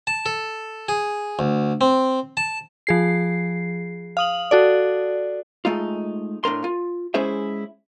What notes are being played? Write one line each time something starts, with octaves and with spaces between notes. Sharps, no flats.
A5
A4
G#4
D2
C4
A5
F3 G#4 C7
F5 D#6 F#7
F#4 A4 D5
G#3 A3 D#4 F4
A2 D4 A#4 C6
F4
G#3 C#4 E4 G#4 C5 E5